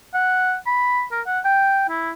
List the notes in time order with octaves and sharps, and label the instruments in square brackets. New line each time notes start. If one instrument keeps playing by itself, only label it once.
[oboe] F#5
B5
A#4
F#5
G5
E4